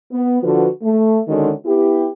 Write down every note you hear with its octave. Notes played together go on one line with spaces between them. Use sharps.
B3
D3 F3 F#4 B4
A3
D3 D#3 G#3 C#4 F#4
B3 E4 G4